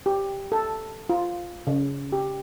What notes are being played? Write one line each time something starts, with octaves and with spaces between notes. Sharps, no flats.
G4
A4
F4
C#3
G4